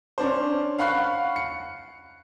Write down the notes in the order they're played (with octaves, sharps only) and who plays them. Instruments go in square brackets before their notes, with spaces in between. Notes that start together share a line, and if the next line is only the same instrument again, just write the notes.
[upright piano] C#4 D4 C5
F5 F#5 B5 C#6 F#6 C7
C#7